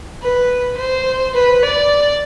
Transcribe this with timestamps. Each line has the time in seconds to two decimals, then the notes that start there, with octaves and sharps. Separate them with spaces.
0.22 B4
0.78 C5
1.35 B4
1.63 D5